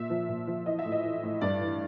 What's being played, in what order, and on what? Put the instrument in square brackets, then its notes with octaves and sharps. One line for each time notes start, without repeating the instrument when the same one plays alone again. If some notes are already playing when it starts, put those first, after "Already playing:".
Already playing: [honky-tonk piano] A#2 E5
F3
A#2
F3
E3 D#5
E5
A2
D#5
E3
A2
G2 D5
E3